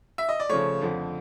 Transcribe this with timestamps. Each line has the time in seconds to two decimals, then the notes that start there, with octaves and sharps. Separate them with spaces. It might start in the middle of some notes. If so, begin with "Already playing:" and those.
0.18 E5
0.29 D#5
0.40 D5
0.49 C#3 F3 A3 C#5
0.81 F2 D3 F3